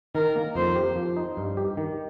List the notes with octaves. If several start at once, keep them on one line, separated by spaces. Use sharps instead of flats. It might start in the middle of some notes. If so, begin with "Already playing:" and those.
D#3 A#4
A#3
F2 C5
G4
F3
D#4
G2
G4
D#3